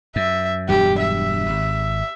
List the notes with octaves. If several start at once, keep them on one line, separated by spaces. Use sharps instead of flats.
F#2 E5
E1 G2 F#3 G4
E5
G#1